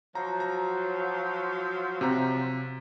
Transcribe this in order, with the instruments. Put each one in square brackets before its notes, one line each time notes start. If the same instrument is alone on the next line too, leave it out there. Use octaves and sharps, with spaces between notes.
[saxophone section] F3 F#3 [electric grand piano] A#5
[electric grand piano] A#5
C3 A#5